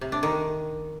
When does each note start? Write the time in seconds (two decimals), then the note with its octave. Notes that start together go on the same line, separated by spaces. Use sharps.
0.01 C3
0.12 D4
0.23 D#3